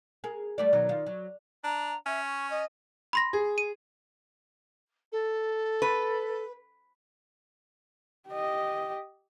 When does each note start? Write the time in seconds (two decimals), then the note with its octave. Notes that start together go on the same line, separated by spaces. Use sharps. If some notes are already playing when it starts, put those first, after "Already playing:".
0.24 G#4 A#4
0.58 G3 A3 D5
0.73 B2 D#3 F#3
0.89 D#3 F4
1.06 F#3
1.64 D4 A#5
2.06 C#4 E5
2.23 C#6
2.50 D#5
3.13 B5 C6 A#6
3.33 G#4
3.58 D#7
5.12 A4
5.82 B4
8.29 G4 D#5